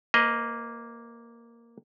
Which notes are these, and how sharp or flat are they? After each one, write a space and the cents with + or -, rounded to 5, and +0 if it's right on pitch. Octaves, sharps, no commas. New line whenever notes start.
A#3 +0 B4 +40 D#5 +0